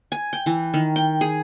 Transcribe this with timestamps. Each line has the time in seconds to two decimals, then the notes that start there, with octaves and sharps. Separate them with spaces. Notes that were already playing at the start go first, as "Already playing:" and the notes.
0.12 G#5
0.33 G5
0.46 E3
0.74 D#3
0.96 G5
1.21 G#4